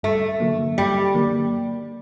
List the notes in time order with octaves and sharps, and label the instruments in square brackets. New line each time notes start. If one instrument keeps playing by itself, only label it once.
[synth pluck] G2 [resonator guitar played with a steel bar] A3
[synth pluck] D3 F#3 A#3
[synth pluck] G2 [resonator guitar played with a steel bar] G3
[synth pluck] D3 F#3 A#3